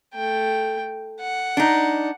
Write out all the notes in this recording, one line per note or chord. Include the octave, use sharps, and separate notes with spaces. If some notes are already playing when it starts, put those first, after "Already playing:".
A3 G5
F#5
D4 D#4